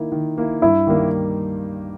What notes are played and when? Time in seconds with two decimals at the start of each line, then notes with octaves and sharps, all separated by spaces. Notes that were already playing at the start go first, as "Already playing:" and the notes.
Already playing: D#3 A#3 E4
0.12 D#3
0.38 A#3 E4
0.62 G2 E4
0.87 D#3 G3 A#3